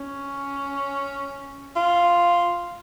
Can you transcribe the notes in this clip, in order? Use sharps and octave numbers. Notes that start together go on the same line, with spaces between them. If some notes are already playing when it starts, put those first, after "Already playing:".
Already playing: C#4
F4